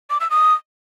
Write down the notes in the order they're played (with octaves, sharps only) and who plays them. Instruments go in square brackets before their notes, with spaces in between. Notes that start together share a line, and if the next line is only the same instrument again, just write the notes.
[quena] D6
E6
D#6